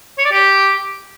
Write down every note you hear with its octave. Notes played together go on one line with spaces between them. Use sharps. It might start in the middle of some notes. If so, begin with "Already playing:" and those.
C#5
D5
G4